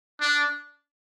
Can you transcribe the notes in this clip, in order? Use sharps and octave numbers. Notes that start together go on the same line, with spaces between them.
D4